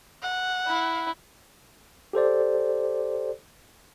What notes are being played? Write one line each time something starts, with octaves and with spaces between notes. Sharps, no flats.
F#5
E4
G4 A4 C5 D5